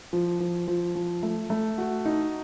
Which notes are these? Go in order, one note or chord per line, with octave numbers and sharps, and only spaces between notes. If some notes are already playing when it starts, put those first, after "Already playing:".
F3
F3
F3
F3
A3
A3
F#4
D#4